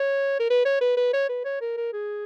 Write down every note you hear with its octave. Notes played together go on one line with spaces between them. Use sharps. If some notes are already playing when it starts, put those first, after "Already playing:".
Already playing: C#5
A#4
B4
C#5
B4
B4
C#5
B4
C#5
A#4
A#4
G#4